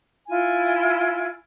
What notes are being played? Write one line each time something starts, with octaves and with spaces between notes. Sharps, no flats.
E4 F4 G#5